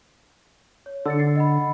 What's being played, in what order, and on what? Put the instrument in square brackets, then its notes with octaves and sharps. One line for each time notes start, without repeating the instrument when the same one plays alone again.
[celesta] C#5
[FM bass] D3 [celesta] E6 A6 C#7
[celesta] A6 C7
D#5 F#5 B5